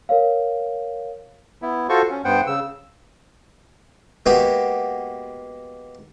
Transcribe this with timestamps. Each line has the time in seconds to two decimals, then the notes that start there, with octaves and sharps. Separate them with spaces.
0.09 A#4 C#5 F5
1.62 B3 E4
1.89 F4 F#4 A4 C5 C#6
2.10 C#4
2.25 G2 B3 C5 F#5 G5
2.47 C#3 E6
4.26 G#3 A#3 B3 F#4 G4